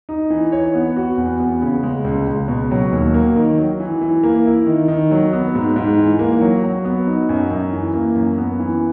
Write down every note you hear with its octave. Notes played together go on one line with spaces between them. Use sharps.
D#4
E3
C#5
B3
F#4
E2
B3
C#3
G#3
C#2
C#2
B2
F#3
D#2
A#3
D#3
F#3
E3
E3
A#3
E4
D#3
D#3
F#3
B3
G#2
G#2
E3
A#3
F#3
F#3
B3
D#4
F#2
F#2
E3
A#3
F#2
B3
E3